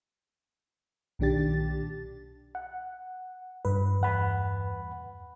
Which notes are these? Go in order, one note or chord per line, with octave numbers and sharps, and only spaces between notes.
B1 A#2 D#3 D4 G4 A6
F#5
G2 B4
E2 F#5 B5